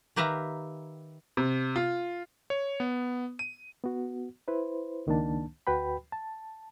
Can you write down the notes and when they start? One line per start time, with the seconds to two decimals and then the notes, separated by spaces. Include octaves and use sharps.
0.16 D#3 G4 B4 E5 F5 A#5
1.37 C3
1.76 F4
2.50 C#5
2.80 B3
3.39 D#7
3.84 B3 F#4
4.48 E4 B4 C5
5.07 C#2 D#3 A#3 D4 A5
5.67 D2 F#4 B4 G5 B5
6.12 A5